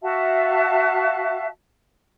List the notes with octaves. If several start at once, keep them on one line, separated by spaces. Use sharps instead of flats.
F#4 E5 F5 A5